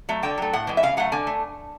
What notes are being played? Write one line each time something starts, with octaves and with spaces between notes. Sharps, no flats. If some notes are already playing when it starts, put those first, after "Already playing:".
F#3 A3
D3 G5
F#3 A3
A2 F#5
E3 G#3
E5
C#3 F5
F#3 A3 F#5
D3 G#5
A3